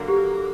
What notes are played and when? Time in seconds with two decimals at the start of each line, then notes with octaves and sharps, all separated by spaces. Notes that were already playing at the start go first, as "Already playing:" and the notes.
Already playing: D3 F#3 A#3
0.08 G4